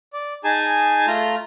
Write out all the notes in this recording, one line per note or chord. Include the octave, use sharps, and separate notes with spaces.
D5
D#4 G#4 G#5 A5
A3 F4 A#5